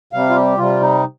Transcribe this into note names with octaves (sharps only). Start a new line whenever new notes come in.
C3 G3 F5
F4
G4
C3 G3 F4
D#4